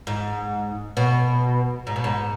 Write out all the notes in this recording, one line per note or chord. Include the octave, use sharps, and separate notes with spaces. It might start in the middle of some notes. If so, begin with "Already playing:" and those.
G#2
B2
G#2
B2
G#2